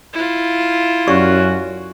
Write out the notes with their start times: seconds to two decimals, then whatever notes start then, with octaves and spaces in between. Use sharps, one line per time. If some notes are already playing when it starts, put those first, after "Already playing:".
0.13 E4 F4
1.08 F#2 C#4 F#4 G4 D5 C#6